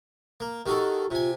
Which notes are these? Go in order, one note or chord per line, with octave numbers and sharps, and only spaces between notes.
A#3
D#3 F#4 G4 A4
C3 F4 G#5